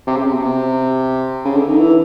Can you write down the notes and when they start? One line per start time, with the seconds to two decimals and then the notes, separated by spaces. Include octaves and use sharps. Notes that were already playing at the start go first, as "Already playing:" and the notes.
0.07 C3
0.16 C#3
0.24 C3
0.33 B2
0.41 C3
1.44 C#3
1.56 D3
1.67 D#3
1.79 E3